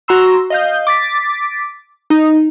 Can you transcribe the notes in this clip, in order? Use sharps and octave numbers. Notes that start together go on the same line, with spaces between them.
F#4 A#5 C6 E6
D#5 F5 G6
D6 A6 B6
D#4